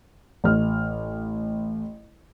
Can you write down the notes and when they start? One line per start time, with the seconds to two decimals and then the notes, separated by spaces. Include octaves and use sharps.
0.44 A1 F6